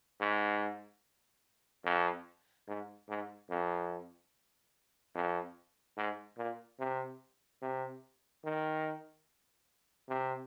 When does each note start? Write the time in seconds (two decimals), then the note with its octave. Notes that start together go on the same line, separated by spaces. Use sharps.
0.20 G#2
1.85 F2
2.68 G#2
3.09 G#2
3.50 F2
5.15 F2
5.97 G#2
6.38 A#2
6.79 C3
7.62 C3
8.44 D#3
10.09 C3